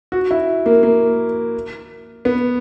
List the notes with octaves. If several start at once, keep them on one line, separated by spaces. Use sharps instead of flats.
F#4
E4
A#3
A#3
B3